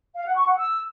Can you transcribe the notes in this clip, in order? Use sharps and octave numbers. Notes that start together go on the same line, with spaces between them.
F5
F#5
C#6
F#5
E6